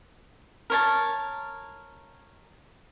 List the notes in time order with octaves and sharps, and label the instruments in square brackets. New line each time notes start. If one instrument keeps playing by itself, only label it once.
[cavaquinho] A#4 C#5 A5